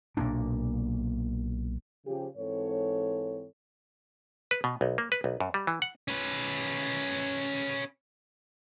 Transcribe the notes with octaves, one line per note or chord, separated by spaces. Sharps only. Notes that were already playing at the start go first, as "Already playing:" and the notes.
B1 A#2 A#3 D4
C#3 F3 G4
G#2 E3 C4 A4 C#5
B4
B2
B1
A#3
B4
B1
F#2
G3
E3
F#5
C#4 B4